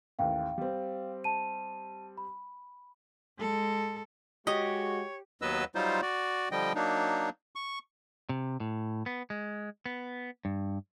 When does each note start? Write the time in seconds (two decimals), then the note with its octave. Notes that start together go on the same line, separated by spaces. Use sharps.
0.19 A1 D#2 A2 F5 G5
0.58 G3 C4
1.24 A5 D#7
2.17 B5
3.38 G#3 A4
4.47 G#3 F#4 G4 C#5 D#5
5.42 D#2 F#3 B3 B4 D#5 E6
5.75 F#3 G3 D#4 F4 C5
6.02 F#4 D5
6.52 D3 F3 G3 D#5 G5
6.75 F#3 A#3 D4 D#4
7.55 C#6
8.29 C3
8.60 A2
9.06 B3
9.30 G#3
9.86 B3
10.45 G2